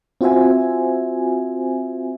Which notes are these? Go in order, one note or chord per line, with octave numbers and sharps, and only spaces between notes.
C4 F4 F#4 C5 E5 G#5